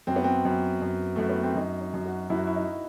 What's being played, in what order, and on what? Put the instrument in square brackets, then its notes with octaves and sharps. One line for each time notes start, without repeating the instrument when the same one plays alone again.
[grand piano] F#2 [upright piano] C4
[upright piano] B3
C4
[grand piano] F#2
F#2
[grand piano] F#2 [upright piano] A3
[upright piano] B3
C4
[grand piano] F#2 [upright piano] D#4
[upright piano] D#4
[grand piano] F#2
[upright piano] F#4
[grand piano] F#2 [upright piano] E4
[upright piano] F#4
E4
D#4